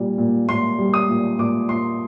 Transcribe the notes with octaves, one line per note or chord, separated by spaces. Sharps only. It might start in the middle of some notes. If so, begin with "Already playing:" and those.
Already playing: A#2 G3
A#2
A#2 C6
G3
D#6
A#2
A#2 D6
A#2 C6